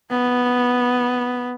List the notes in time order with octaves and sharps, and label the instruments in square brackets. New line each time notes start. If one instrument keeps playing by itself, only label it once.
[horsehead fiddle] B3